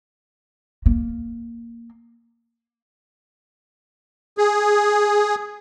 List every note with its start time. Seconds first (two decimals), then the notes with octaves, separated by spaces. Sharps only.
0.86 A#3
4.38 G#4